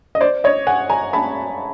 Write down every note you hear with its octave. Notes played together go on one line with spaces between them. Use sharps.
D#5
C5 D5
C#5 D#5
F#5 G#5
G#5 A#5
A5 B5